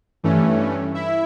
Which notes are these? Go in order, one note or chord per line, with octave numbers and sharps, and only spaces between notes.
G2 E3 A3 C#4
E4 E5